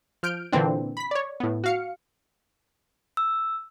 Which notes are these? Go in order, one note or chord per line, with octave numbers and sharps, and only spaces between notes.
F3 F6 G6 D7
A#2 D3 E3 A#3 C4 D4
B5 B6
C#5 D5
A2 B3
F#4 F5 C#7
E6